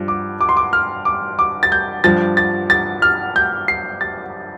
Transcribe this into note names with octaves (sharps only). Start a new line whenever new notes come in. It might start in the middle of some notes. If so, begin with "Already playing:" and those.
Already playing: G2 F3
D6
D6
C6
D6
F6
D6
D6
A6
G6
G2 F3 A6
A6
A6
F6
G6
C7
A6